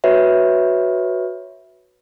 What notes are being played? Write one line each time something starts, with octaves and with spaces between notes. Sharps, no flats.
F#4 B4 C#5 E5